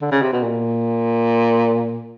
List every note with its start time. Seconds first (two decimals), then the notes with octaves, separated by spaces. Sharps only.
0.02 D3
0.12 C#3
0.22 C3
0.33 B2
0.43 A#2